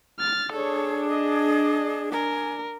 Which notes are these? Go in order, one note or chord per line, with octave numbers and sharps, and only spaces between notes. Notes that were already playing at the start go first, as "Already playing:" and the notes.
F6 A6
D4 G#4 A4 C#5
D#5
A#4 G#5